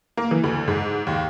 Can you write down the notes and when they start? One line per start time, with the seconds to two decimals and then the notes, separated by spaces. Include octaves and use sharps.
0.17 A#3
0.31 E3
0.44 D2
0.68 G#2
1.07 D#2